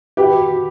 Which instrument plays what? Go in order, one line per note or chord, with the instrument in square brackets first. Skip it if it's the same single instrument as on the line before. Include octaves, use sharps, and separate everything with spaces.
[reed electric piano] F#4 [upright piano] G4 B4